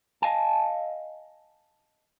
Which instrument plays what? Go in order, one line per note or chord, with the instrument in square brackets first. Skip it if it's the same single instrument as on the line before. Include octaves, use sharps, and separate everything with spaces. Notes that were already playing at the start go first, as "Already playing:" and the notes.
[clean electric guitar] D#5 F5 G#5 A5